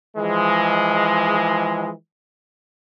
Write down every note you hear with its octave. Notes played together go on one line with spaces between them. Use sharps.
E3 F3 G#3